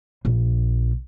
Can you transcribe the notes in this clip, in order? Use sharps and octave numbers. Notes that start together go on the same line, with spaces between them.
A#1